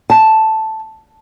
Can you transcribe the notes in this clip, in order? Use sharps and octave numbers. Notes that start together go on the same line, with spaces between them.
A5